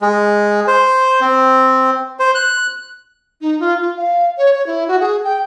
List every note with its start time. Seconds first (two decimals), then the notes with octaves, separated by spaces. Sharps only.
0.01 G#3
0.67 C5
1.21 C4
2.19 C5
2.35 F#6
3.41 D#4
3.60 F4
3.81 F4
3.97 F5
4.38 C#5
4.55 C#5
4.67 E4
4.88 F#4
5.01 G#4
5.24 G5